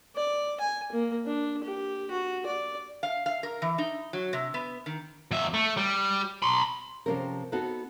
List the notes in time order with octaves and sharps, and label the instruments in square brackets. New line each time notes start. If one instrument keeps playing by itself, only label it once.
[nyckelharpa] D5
G#5
A#3
D4
G4
F#4
D5
[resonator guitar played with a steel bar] F5
F5
A#4
E3
D#4
F#3
C3
B3
D#3
[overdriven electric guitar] F2 E5
A3
G3
B5 C6
[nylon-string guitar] C3 F3 C4 C#4 A4 A#4
B3 C4 D#4 F#4 A4